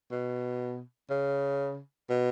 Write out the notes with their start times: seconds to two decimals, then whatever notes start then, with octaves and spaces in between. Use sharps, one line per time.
0.12 B2
1.10 C#3
2.10 B2